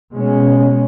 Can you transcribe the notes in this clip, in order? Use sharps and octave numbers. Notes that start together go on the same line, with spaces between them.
B2 G#3 C#4